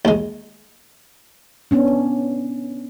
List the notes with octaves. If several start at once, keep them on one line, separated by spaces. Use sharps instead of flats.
D#2 G#3
B3 C#4 D4